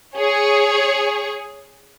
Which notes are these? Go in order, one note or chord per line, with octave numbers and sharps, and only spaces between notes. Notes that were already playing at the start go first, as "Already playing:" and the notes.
G#4 C#5